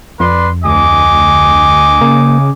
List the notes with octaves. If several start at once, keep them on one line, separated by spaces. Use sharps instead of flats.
F2 B4 D5 C6
D2 D#5 G#5 D6
C#3 A#3